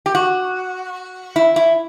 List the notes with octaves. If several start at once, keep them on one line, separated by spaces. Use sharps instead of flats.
G4
F#4
E4
E4